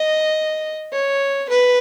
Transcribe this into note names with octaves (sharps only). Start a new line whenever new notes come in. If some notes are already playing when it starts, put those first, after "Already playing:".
Already playing: D#5
C#5
B4